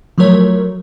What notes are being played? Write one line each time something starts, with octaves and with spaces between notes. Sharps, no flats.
F3 F#3 A3 A#4 C#5